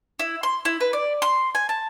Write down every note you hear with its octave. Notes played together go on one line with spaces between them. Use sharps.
E4
C6
E4
B4
D5
C6
G#5
A5